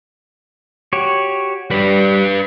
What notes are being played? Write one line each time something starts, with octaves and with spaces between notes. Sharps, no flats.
F#4 G4 C#5
G3 D4 B4